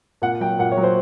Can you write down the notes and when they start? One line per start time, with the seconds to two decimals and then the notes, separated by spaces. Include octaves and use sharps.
0.22 A#2 F#5
0.40 F#3 G5
0.59 A#2 F#5
0.72 C#5
0.77 F#3
0.83 C5